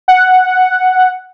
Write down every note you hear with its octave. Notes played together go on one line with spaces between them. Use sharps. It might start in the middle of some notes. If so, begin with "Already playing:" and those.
F#5